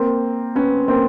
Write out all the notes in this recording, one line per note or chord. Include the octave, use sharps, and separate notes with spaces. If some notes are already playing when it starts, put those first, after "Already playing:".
Already playing: A#3 C4
B3 C#4
A#3 C4